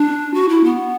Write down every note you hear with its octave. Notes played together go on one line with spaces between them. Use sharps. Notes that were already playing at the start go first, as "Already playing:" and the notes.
Already playing: D4
F#4
E4
B3